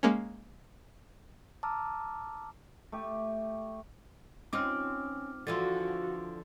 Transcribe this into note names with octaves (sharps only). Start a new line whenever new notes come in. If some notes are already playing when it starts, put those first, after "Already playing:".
G#3 A#3 C#4
A5 A#5 D6 E6 F6
A3 G4
C4 C#4 D#4 F4 D6 F6
D3 E3 F3 F4 F#4 C6 A6